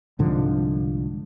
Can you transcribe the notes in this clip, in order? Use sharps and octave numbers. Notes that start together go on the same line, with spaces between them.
C2 G#2 D3 F3